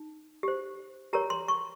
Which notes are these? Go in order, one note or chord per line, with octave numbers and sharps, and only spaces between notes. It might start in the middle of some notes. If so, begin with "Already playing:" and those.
Already playing: D#4
G4 C5
G4 A#4 C#5 A#5
C6
C#6